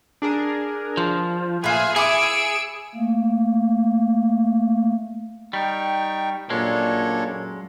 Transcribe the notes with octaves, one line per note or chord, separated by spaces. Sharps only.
D4 G#4 A#4
F3
A#2 A3 F4 G#4 B4 E5 G#5
E4 G#4 G#5 D6 E6 G#6 C#7 D7
A3 A#3
G3 D#4 G5 C#6
F#2 A#2 G#3 D4 A4 C#5